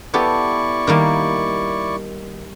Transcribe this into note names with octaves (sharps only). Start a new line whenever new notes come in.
B3 E4 G4 A4 D5 C#6
D#3 G3 A#3